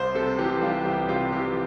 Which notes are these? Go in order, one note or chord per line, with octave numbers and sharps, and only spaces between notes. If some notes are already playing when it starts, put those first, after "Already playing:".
Already playing: C2 C5
C3 A4
E3 G4
G3 F4
C2 G4
C3 F4
E3 G4